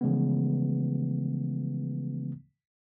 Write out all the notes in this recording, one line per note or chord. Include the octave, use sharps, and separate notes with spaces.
C#3 E3 F3 G#3 A3 B3